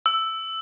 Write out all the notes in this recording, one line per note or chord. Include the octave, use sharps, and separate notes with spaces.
E6